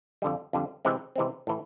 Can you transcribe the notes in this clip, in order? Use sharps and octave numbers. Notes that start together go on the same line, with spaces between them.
F2 D3 G3
F2 D3 G3
C3 E3 G#3 C4
C3 E3 G#3 C4
A2 E3